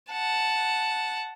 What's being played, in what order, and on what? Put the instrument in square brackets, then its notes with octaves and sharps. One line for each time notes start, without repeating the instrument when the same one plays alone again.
[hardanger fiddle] F#5 A5